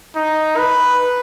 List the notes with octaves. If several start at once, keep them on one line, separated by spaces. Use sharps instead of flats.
D#4
B4